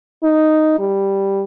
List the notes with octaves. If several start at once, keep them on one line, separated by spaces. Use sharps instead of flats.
D#4
G3